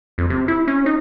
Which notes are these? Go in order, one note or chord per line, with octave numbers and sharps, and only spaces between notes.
F2
C3
E4
C#4
D#4